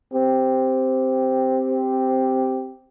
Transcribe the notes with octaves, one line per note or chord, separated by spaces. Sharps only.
C4 G4